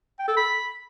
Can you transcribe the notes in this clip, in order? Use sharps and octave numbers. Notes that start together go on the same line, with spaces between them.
G5
A4
B5